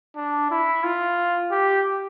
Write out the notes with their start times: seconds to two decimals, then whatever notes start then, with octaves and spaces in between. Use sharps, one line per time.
0.16 D4
0.51 E4
0.84 F4
1.51 G4